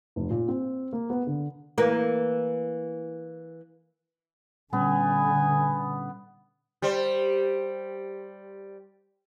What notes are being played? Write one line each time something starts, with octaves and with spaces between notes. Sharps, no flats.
F1
A#2
C4
A#3
B3
D3
E3 A#3
A#2 D3 G3 B3 C#4 G#5
G3 C5